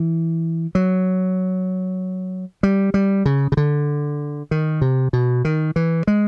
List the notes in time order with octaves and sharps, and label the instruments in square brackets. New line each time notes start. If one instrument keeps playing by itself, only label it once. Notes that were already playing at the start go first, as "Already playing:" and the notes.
Already playing: [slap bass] E3
F#3
G3
G3
C#3
C#3
D3
D#3
C3
B2
D#3
E3
G#3